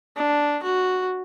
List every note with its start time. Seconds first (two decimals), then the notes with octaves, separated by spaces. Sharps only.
0.17 D4
0.63 F#4